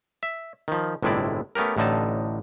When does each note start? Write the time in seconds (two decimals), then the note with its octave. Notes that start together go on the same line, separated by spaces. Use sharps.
0.23 E5
0.68 D#3 F3
1.03 G1 A2 C3 G#3 E4 D5
1.55 A3 B3 C#4 G4 A#4
1.76 A1 A2 D3 D#4 A5